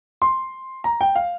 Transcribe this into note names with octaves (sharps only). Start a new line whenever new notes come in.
C6
A#5
G5
F5